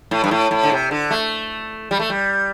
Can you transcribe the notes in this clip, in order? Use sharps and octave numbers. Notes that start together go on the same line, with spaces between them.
A2
G2
A2
A2
D3
C3
D3
A3
G3
A3
G3